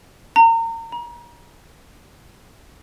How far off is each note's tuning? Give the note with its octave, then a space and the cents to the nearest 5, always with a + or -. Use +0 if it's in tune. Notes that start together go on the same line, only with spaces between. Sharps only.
A#5 -35
A#5 +35